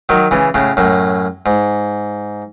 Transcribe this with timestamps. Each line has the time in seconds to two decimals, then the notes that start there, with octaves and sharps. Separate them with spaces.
0.09 D#3 F#3
0.31 C#3 E3
0.54 A2 C#3
0.77 F#2 A2
1.46 G#2